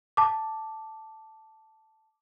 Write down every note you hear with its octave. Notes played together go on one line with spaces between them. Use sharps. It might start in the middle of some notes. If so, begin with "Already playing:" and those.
A5 D6